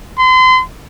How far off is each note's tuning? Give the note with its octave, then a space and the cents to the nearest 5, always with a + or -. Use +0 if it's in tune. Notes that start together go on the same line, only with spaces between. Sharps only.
C6 -35